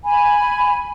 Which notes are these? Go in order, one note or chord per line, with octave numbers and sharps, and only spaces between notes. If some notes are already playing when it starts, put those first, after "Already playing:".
G#5 B5